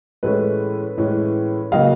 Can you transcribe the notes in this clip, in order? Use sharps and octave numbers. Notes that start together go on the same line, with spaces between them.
A2 E3 G#3 C#4 A4 B4
A2 E3 G#3 C#4
C#3 F#3 A#3 D#5 F5